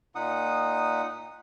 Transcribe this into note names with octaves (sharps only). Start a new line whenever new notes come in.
A#2 D#4 F#5 D#6